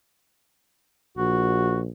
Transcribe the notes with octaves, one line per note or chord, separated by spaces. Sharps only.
A#1 F#4